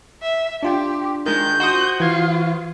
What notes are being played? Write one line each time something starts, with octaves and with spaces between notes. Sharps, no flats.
E5
D4 F4 G4 G5
D#3 G#3 G6
F#4 C5 D#6
E3 F4 G#6